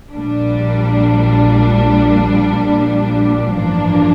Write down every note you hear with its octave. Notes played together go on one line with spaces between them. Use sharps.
A#1 A#2 G3 D4
A1 G2 F3 A#3 D4